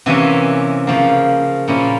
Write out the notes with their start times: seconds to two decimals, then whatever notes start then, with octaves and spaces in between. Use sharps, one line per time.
0.06 C3 E3 A#3 C#4 G#5
0.87 C#3 F3 A#3
1.68 A#2 F3 A#3 C#4 E4